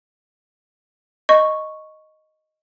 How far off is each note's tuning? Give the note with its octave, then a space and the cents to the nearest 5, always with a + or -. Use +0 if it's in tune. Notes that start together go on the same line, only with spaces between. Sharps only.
D#5 +0 C#6 +0